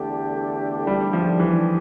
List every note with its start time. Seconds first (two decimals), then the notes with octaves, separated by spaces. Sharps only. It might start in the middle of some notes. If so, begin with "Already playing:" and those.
Already playing: E2 D3 A3 D4 G4
0.87 G3
1.13 F3
1.39 E3